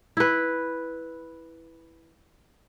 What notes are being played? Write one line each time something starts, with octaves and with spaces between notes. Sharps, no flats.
E4 B4